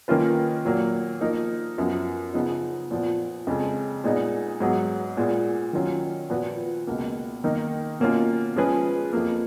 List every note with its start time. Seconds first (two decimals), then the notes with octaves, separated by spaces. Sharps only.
0.08 D#3 A#3 C#4 F4 B4
0.65 A#2 F#3 A#3
1.21 F3 A#3 D#4 A#4
1.78 F#2 F3 B3
2.33 C#3 F3 B3 D#4
2.91 A#2 F3 B3
3.47 F2 C#3 G#3
4.04 A#2 G#3 B3 D#4
4.60 G#2 F#3 B3 F#4
5.17 A#2 G#3 B3 F4
5.73 D#3 F#3 C#4 F4
6.29 A#2 F3 B3 F#4 B4
6.87 C#2 B2 A#3
7.44 D#3 A#3 D#4
8.00 B2 A#3 C#4 F4
8.56 F3 G#3 C#4 G#4 B4
9.13 F2 F3 A#3